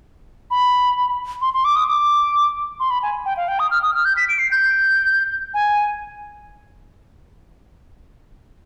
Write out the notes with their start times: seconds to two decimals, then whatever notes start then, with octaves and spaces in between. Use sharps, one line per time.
0.51 B5
1.42 C6
1.54 C6
1.65 D6
1.76 D#6
1.87 D6
2.80 C6
2.90 B5
3.03 G#5
3.26 G5
3.37 F5
3.48 G5
3.59 D#6
3.71 F6
3.83 D#6
3.94 F6
4.05 G6
4.17 B6
4.29 D7
4.39 C7
4.51 G6
5.54 G#5